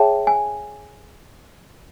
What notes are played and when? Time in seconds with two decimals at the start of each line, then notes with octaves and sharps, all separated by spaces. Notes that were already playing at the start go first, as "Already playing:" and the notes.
Already playing: G#4 C#5 E5 G5 A5
0.27 G#5